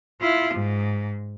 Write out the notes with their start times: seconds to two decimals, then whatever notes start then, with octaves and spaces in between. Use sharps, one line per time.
0.20 E4 F4
0.54 G#2